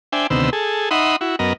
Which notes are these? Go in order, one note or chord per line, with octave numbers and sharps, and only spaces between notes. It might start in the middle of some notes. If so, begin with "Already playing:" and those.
D4 C5 E5 G5 G#5
D2 C3 D#3 B3 C5 E6
G#4 A4
D#4 E5 F#5 B5 C6 D#6
E4 F#4
F#2 B3 A#4 D#5